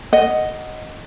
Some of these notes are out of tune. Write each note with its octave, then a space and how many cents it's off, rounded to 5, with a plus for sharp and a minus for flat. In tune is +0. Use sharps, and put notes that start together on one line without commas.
D#5 +0 F#5 +5